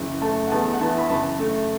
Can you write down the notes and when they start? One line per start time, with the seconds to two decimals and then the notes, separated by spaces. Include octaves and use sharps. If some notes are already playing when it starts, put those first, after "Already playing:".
Already playing: F#1 E3
0.22 A3 A5
0.47 F#5
0.52 E2 A5
0.74 F#5
0.81 E3 A5
0.98 B5
1.10 F#1 A5
1.39 A3